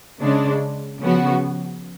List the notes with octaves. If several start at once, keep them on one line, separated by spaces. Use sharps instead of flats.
C#3 G#3 D4
C#3 F3 B3 F#4